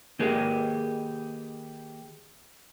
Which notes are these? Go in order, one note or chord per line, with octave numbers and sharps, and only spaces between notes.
D#3 A#3 G4 G#4 B4